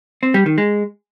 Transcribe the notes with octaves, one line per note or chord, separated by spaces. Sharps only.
C4
G3
D#3
G#3